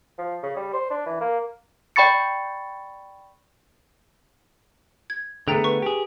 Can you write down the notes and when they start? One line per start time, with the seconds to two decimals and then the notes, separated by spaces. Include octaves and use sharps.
0.18 F3
0.43 C#3
0.56 G3
0.73 C5
0.90 D4
1.06 E3
1.21 A#3
1.96 D5 G5 B5 C#6 A6 C#7
5.10 G#6
5.48 D3 A3 B3 G#4 G5 A#5
5.64 B4 C#6
5.82 G4 G#4